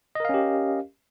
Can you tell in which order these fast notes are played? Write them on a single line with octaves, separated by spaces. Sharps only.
D#5 A#4 F5 C#4 G4